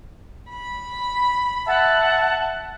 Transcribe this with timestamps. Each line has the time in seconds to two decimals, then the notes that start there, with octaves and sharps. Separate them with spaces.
0.49 B5
1.68 E5 F#5 A5